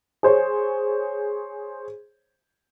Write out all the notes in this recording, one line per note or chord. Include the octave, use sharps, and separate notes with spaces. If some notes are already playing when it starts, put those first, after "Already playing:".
G#4 C5 C#5